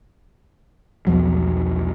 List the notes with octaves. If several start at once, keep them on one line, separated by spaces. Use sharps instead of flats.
B1 E2 F3 F#3